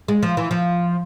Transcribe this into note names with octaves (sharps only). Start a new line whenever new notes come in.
G#3
F3
E3
F3